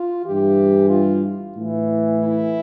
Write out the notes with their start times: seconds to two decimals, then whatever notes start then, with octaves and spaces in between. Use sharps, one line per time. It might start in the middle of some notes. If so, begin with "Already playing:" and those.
Already playing: F4
0.25 G2 E3 G4
0.90 F4
1.55 A2 E3
2.20 E4